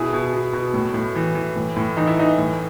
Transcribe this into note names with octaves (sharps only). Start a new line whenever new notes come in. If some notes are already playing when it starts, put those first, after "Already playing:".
Already playing: B2 E4 G#4
B2
B2
B2
A2
A2
E3
E3
A2
A2
E3 D#4
E4
E3 D#4
A2